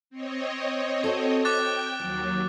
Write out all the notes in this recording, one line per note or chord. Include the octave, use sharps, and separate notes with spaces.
C4 C#5 D#5
F#4 A4
G5 D6 F#6 A6
D#2 F3 F#3